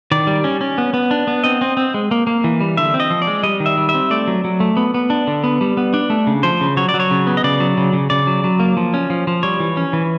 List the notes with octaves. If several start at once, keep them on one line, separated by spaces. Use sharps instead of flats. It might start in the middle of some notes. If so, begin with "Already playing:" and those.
D#3 D5
G3
C#4
C#4
B3
B3
D4
B3
C4 D#5
C4
C4
G#3
A#3
A#3
E3
G3
D3 E5
C4
D#5
F3
D5
G#3
G3 D#5
D#3
E5
G3
E5
C4
A3 D5
F#3
F#3
A3
B3
B3
D4
D3
B3
G3
B3
D4
A3
C#3
F3 C5
C#3
F#3 C#5
D5
F#3
C#5
C#3
B3
D#5
C#3 D5
F#3
C#3
C#3
C#3 D5
F#3
F#3
A#3
F3
C#4
F3
F3
G3 C#5
E3
C#4
E3